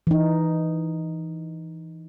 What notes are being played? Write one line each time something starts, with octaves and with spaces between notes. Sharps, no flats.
E3 D#4